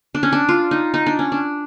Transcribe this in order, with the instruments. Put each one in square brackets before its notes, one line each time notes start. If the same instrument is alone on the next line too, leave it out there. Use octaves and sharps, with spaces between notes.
[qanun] D4
C#4
D4
F4
D#4
D#4
D4
C#4
D4